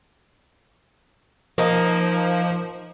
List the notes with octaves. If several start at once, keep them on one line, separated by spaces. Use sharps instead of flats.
F3 A#3 D#4